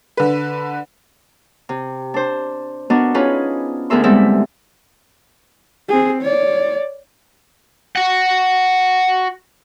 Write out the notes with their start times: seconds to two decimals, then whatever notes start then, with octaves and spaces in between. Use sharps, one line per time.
0.17 D3 B4
1.69 C3
2.14 D4 C5
2.90 B3 D4 F#4 A#4 D#5
3.14 C#4 D#4 F4 G#4 B4
3.90 D2 B3 G#4 A#4 E5 C6
4.04 G3 G#3 B3 C4 E4 E5
5.89 C4 G#4
6.22 C#5 D5
7.96 F#4 F#5